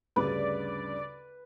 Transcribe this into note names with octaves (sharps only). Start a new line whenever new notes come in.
D2 G2 C#3 B4 D5